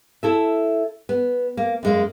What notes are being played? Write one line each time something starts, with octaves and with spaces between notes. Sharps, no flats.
E4 A4 E5
B3
A#3
F#2 G#3 A#3